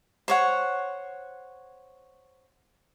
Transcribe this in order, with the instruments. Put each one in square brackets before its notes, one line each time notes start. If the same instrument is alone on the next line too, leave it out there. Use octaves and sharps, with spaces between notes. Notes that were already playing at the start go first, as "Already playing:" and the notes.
[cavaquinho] C5 C#5 F#5